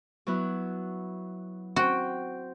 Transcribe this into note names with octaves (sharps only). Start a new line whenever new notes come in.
F#3 B3 E4
C4 F#4 G5